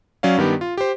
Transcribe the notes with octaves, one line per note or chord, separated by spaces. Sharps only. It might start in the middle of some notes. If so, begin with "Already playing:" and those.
F#3 C#4 D5 F5
G2 D#3 B3 G4
F4
G4 C5